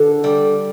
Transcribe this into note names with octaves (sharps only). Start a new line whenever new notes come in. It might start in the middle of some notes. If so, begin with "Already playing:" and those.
Already playing: D3 A4
G3